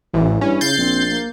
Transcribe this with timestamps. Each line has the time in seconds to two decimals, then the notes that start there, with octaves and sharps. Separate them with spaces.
0.14 A1 E3
0.41 G2 C#4 E4
0.61 C#3 G6 A6 C7
0.77 A#1 C4
1.09 A#3